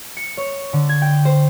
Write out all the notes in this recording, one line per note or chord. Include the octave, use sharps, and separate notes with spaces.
C#7
C#5
D3
G#6
G5
C5